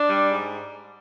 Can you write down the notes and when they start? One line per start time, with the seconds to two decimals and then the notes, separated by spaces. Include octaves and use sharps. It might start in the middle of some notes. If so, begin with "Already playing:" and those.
Already playing: D4
0.09 G3
0.29 G#2